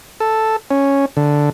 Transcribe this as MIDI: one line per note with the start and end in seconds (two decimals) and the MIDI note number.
0.20 0.56 69
0.71 1.05 61
1.17 1.50 50